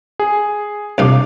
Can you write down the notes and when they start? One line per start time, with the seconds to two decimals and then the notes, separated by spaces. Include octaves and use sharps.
0.20 G#4
0.98 C2 D4 D#4 F5 D6